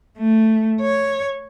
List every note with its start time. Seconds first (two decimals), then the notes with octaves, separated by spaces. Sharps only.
0.18 A3
0.81 C#5